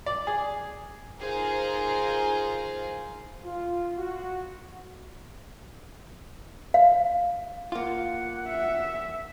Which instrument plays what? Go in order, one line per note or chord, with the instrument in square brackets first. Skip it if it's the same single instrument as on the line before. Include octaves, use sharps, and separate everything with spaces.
[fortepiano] D5
G#4
[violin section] D#4 F4 G#4 A#4 C5 F5
[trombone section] F4
F#4
[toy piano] F5
[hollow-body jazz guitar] A#3 F4 [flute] F#5
[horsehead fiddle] E5